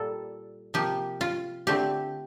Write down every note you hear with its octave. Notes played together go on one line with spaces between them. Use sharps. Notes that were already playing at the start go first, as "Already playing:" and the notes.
Already playing: A#2 G3 A#3 A4
C3 F3 A#3 G4
F4
D3 A3 C4 G4